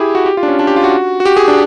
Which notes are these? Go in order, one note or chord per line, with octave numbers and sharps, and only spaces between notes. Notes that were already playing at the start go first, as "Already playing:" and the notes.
Already playing: E4 G4 G#4
F#4
G4
F4
D4
C#4
D4
G4
F4
F#4
F#4
G4
G#4
D4